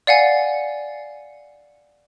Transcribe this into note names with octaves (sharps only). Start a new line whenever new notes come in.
D5 F5 F#5 G#5